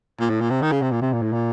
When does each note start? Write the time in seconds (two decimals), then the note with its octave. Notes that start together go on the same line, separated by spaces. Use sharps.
0.21 A#2
0.30 A2
0.41 A#2
0.50 C3
0.62 D#3
0.72 C#3
0.82 C3
0.91 A#2
1.02 C3
1.13 A#2
1.22 A2
1.33 A#2